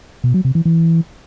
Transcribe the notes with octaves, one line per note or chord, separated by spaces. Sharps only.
B2
F#3
C3
E3
E3